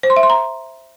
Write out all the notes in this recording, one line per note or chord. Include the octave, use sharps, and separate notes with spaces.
C5
C6
E5
C6
A#5